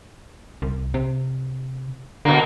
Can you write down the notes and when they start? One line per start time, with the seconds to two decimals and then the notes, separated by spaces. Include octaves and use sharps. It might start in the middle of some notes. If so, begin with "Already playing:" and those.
0.62 C2
0.94 C3
2.25 B2 D3 A#3